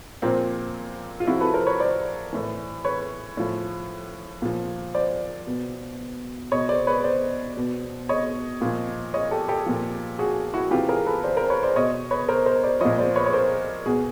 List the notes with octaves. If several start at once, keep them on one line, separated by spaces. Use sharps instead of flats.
A#2 F3 A#3 C4
F4
C3 F3 E4 F#4
A4 B4
A#4 C5
B4 C#5
C5 D5
A2 E3
B4 C#5
A2 F3
A#2 F3
C5 D5
B2
B2 C#5 D#5
C5 D5
B4 C#5
C5 D5
B2
C#5 D#5
A#2 F3
C#5 D#5
G4 A4
G4 A4
A#2 F3
F#4 G#4
E4 F#4
C3 E3 F4 G4
G#4 A#4
A4 B4
C5 D5
A#4 C5
B4 C#5
C5 D5
B2 C#5 D#5
B4 C#5
A#4 C5
A#4 C5
C5 D5
A#2 F3 C#5 D#5
C5 D5
B4 C#5
C#5
A#4 C5
B2 F#4 G#4